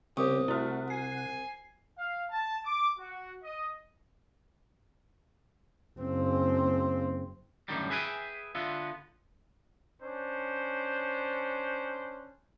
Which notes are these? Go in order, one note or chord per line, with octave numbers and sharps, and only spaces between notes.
C2 C#3 B3 G4 C#5 D#6
C3 A3 E4 F#4 F#5
G#5 C7
F5
A5
D6
F#4
D#5
F#1 C4
F#2 A2 D3 D#3 G3
G#4 B4 E5 G5 G#5
D3 B3 F4 E5
C#4 D4 C5